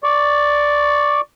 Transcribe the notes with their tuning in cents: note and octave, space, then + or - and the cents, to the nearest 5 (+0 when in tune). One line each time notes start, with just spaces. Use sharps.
D5 +0 C#6 +0